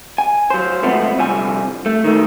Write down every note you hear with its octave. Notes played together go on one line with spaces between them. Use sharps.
G#5
F#3 C5
C#2 F#2 F3 A3 B3 C4
C2 D3 F3 G#5
A3
D#3 A3